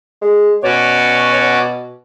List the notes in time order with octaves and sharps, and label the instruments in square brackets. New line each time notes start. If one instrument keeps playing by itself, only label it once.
[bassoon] G#3
[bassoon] B2 [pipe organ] C#4 F#4 D5 [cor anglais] C#5